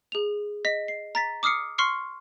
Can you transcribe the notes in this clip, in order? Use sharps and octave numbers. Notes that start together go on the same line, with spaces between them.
G#4 F7
D#5 B6
C7
A#5 A6 B6
D6 D#6 F6 C7 C#7
C6 C#6 F6 C7 C#7